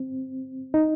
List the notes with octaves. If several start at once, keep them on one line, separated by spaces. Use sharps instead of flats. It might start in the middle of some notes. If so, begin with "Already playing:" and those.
Already playing: C4
D#4